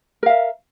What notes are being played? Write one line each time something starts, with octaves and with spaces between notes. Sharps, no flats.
A#4 E5 F5